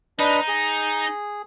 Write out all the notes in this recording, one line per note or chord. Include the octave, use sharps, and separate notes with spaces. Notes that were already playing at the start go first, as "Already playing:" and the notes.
D4 D#4 B4 D#5
G#4